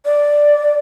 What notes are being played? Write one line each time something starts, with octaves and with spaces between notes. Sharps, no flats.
D5